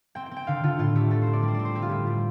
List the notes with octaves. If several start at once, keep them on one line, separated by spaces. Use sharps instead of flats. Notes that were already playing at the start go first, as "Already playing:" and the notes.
C4 G5
G5
C4
G5
D3 F5
D3 F4
A2 F4
A3 G4
D3 A4
C4 C5
D5
G3
C5
D5
C4
C5
C4 G4
F4
A2 G4
G3